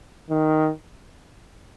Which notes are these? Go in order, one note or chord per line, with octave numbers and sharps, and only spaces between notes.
D#3